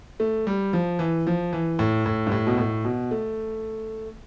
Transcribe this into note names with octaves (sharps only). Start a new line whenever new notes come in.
A3
G3
F3
E3
F3
E3
A2
A2
G2
A2
B2
A2
B2
A3